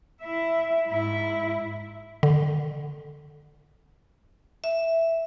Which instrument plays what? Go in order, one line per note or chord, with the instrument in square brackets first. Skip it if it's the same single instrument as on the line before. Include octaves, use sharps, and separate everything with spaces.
[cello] E4 E5
G#2 E4
[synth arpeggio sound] D3
[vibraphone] E5